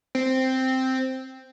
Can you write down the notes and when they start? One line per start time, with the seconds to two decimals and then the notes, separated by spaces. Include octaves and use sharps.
0.15 C4